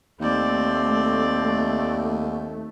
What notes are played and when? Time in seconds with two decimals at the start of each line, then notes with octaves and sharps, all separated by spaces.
0.20 D#2 A3 C4 D5